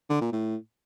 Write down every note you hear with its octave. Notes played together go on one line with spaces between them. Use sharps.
D3
A#2
A2